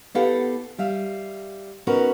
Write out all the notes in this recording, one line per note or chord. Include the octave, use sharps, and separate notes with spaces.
B3 E4 G4 A4 F5 F#5
G3 E5 F5
B3 C#4 D#4 F#4 A#4 B4